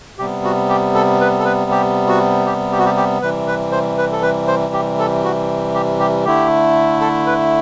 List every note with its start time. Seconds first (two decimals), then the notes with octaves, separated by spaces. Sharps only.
0.19 C3 G3 B3 G4
0.44 F#4
0.69 G4
0.95 A4
1.21 B4
1.39 A4
1.45 B4
1.71 G4
2.08 F#4
2.46 G4
2.72 G4
2.78 F#4
2.86 G4
2.97 G4
3.22 C3 E3 G3 B4
3.47 B4
3.72 C5
3.98 B4
4.12 A4
4.22 B4
4.48 C5
4.73 G4
4.99 A4
5.24 F#4
5.74 G4
5.99 G4
6.25 D3 A3 E4 G4
7.01 A4
7.26 B4